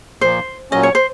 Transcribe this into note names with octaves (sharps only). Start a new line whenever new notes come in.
A#2 F3 A#3 C5
A#2 F#3 C#4 D#5
C#5
C5